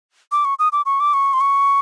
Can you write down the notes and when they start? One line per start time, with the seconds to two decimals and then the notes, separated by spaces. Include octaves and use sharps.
0.32 D6
0.45 C#6
0.59 D#6
0.72 D6
0.86 C#6
1.00 D6
1.14 C#6
1.33 C6
1.41 C#6